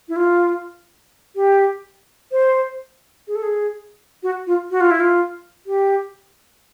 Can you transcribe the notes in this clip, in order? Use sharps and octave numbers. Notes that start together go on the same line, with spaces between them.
E4
F4
G4
C5
G#4
A4
G#4
F#4
F4
F#4
F4
E4
F4
G4